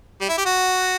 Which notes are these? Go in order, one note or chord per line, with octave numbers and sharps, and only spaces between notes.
G3
E4
G4
F#4